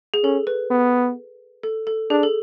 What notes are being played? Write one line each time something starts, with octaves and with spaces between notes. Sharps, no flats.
G#4
C#4 A4
B4
B3
A4
A4
D4 G#4
A4